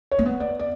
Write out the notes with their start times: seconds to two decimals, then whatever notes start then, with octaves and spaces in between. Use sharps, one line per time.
0.11 C#5
0.19 A#3
0.26 B3
0.40 D5
0.59 D5